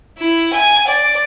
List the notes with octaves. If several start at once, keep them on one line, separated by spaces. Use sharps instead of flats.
E4
G#5
D5